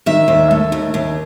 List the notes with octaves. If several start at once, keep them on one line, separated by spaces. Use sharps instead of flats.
D#3 E5
D#2
A3
D#2
D#2